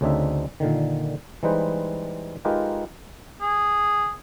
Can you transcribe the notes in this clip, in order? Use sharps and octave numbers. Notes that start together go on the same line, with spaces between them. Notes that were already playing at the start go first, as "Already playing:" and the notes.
D2 C#3 C4 D4 D#4 E5
A#2 D3 D#3
E3 G3 G#3 D#4 B4 C5
G#3 D#4 F4 G4 A#4 B4
G#4